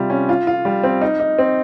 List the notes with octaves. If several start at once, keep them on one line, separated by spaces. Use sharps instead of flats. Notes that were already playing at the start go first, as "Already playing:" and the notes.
Already playing: C3 G3 F4
C#4
F4
F4
G3
C4
D#4
D#4
C4